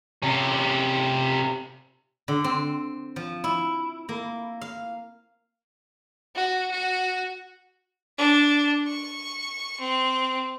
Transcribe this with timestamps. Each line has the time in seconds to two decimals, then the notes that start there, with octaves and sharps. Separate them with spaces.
0.22 C3 C#4
2.28 D3
2.44 C4
3.16 F3
3.44 E4
4.09 A#3
4.61 F5
6.36 F#4
6.72 F#4
8.18 D4
8.87 C#6
9.79 C4